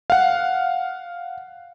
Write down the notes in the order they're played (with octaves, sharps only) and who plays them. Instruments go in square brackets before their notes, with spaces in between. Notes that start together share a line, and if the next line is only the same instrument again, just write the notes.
[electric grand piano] F5 F#5